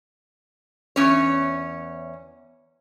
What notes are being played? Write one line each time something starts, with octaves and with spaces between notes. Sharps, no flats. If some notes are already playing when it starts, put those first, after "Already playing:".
E2 C#4 C#5